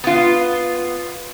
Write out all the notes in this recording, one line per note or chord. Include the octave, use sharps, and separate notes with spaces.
B3 F4